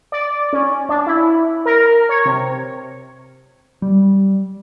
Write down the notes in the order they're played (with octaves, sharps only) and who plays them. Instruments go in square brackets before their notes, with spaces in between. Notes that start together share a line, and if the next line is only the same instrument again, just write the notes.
[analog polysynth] D5
C#4
D4
E4
A#4
C#5
C3
[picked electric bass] G3